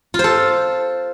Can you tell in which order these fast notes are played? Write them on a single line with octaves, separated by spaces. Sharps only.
F4 C5 A4